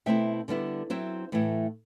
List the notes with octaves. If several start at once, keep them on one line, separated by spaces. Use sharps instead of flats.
B2 A3 C4 E4 E5 G5
D3 G3 B3 E4
F#3 C4 E4 C5 E5
A2 E3 A3 E4